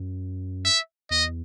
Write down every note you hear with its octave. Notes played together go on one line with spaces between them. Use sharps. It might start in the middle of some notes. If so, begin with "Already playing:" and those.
Already playing: F#2
E5
E2 D#5